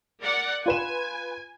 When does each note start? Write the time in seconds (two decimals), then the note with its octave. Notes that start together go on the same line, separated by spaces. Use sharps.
0.22 A#4 D5 F#5
0.66 F4 B4 G#5 E7